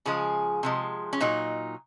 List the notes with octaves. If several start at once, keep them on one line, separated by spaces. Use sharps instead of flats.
C#3 F3 G#3 G#4
C3 F3 G#3
C#4
A#2 F#3 D#4